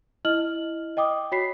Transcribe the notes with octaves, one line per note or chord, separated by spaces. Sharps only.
E4 D#5 F6 F#7
D#5 G5 D6 D#6
F#4 C#5 B5 B6 C7